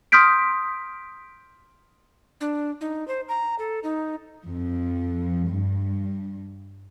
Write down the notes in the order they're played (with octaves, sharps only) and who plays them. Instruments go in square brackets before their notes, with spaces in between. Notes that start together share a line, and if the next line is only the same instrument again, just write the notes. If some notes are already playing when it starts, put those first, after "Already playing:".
[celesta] C6 D#6 F6 G6 B6 D7
[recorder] D4
D#4
C5
A#5
A4
D#4
[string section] F2
G2